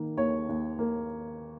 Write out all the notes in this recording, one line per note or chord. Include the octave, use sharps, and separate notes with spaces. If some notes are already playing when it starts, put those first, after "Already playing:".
Already playing: D#3 A#3
D#2 C#5
D#2
A#3